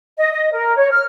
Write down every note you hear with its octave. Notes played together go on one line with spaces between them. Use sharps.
D#5
D#5
A#4
C#5
F6